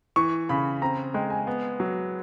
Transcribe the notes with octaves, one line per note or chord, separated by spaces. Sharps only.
E3 C#6
C#3 B5
C4 A#5
G#3 G5
G#5
B3
F#3